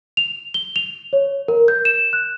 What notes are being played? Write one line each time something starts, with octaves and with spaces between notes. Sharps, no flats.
F7
G7
F7
C#5
A#4
G6
E7
F#6